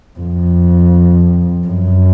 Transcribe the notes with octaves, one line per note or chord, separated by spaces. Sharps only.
F2
F#2